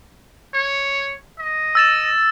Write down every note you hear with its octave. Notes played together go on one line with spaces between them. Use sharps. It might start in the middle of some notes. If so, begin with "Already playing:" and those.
C#5
D#5
E6 A6 E7